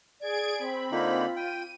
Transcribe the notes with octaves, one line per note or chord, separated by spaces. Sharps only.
G#4 D5 G#6 D7
C4 B5
D3 A#3 D#4 F4
G5 D#7